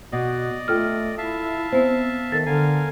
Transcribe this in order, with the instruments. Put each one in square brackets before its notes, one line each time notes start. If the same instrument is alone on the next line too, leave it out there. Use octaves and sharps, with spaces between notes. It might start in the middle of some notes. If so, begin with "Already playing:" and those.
[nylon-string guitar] B2 [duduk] F#4 [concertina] D5 D#5
[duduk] A3 [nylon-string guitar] F4 A4 G5 [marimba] F6
[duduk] E4 [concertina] E5 F5 A5
[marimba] B3 C5 [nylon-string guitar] C4
[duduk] D#3 [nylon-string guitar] A4 [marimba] A6
[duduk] D3 [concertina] A#4 F5 G#5